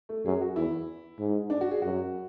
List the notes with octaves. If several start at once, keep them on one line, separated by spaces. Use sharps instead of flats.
A3
F#2 G#4
F#4
E2 E4
G#2
D4
F#4
G#4
F#2 F#4